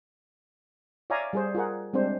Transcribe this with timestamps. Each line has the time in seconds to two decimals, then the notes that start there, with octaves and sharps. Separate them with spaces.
1.10 C#5 D5 E5 F5 G#5 A#5
1.33 G3 G#4 C5
1.55 F4 G#4 A#4 F#5
1.93 G3 G#3 C4 D4 C5